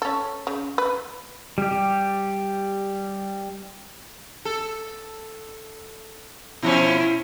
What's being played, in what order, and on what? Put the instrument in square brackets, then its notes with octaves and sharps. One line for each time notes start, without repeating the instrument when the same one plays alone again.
[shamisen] C#4 A4
C#3
B4
[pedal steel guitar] G3 G4
[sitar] A4
[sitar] B2 F3 C#4 [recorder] E4